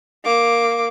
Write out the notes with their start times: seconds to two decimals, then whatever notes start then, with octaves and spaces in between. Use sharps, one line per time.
0.24 A#3 D6